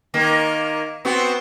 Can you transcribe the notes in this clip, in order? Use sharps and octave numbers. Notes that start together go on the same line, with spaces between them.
D#3 A#3
B3 C4 F#4